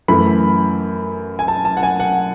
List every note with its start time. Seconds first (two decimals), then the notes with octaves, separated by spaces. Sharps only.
0.08 F#2 E3 A3 B5
1.39 G#5
1.48 A5
1.65 A5
1.77 F#5
1.83 G#5
2.00 F#5